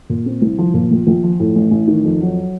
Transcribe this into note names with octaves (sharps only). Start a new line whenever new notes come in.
A#2
C4
C2
F3
A#2
A#1
A#1
F3
A2
A1
A1
D#3
F2
F#3